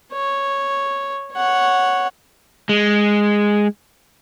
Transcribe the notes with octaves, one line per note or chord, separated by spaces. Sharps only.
C#5
C#5 F#5
G#3